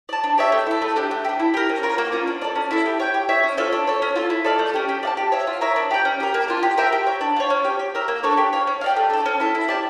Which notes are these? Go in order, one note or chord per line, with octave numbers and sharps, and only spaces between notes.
D5 A5
D4
G4 C#5 E5
A3
E4 A4
A3
D4 G4
A3
G4
D4
E4
G4 A#4
C#4
F4 A#4 C#5
A#3
C#4 F4
D4
A4 D5
C#4
E4 A4
G4
C#5 G5
G4
C#5 E5
C#4
F4 A4 C#5
D4
A4 C#5
C#4
F4 A4
E4
A4 D5 F5
A3
C#4 G4
G4
D5 F5 A5
G4
C#5 E5
F4
A#4 C#5 E5
D4
G4 D5 G5
C#4
G4 A#4
A#3
D4 F4
G4
A#4 E5 G5
G4
C#5 G5
D4
F4 C#5
C#4
G4 C#5
G4
A#4 E5
A#3
D4 A4 C#5
G4
C#5 F5
C#4
G4 D5 F5
A3
D4 A4
C#4
E4 A4
E4
G4 D5 A5